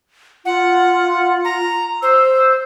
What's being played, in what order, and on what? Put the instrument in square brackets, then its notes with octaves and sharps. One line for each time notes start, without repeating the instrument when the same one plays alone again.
[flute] F4 [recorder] F#5
[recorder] A#5
[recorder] C5 [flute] E6